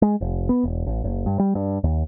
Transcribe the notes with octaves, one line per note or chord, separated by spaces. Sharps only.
G#3
F1
B3
E1
A1
F#1
G2
G3
G2
D#2